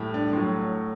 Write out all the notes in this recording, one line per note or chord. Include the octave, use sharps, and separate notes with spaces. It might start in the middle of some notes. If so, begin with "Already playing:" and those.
Already playing: A2 G3
D4
A2 F#3